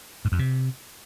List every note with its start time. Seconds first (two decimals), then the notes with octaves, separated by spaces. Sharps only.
0.25 G#2
0.32 F2
0.39 C3